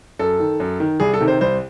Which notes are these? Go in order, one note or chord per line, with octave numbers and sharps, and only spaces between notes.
F#2 A4
D#3
F#2
D#3
C2 G#4
A4
C3 D#3
C5
C2 C5